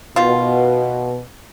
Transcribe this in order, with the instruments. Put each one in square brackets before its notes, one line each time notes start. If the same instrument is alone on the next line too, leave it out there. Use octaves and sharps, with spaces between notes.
[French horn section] B2 [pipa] D#3 F4